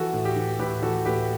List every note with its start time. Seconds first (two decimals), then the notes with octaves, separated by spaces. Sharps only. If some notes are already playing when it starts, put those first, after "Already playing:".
Already playing: E3 F#4 A4
0.13 A2
0.25 G4
0.36 E3
0.59 A2 G4 B4
0.82 E3 F#4 A4
1.05 A2 G4 B4